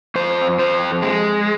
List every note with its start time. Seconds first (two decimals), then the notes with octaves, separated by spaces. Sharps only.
0.15 F2 C5
0.59 F2 C5
1.02 G#3